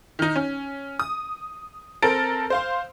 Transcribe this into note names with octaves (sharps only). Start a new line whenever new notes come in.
D#3 D#4
C#4
D#6
C4 A4 A#4 D7
C5 F5 C6